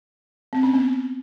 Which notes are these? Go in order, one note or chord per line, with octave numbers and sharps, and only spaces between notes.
C4
C#4
B3